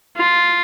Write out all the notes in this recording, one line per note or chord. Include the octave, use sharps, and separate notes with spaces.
F4